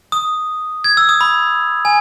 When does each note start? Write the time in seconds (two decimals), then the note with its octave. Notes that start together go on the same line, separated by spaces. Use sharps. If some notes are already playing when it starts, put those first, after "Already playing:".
0.12 D#6
0.84 G#6
0.97 E6
1.09 D#6
1.21 B5
1.85 G#5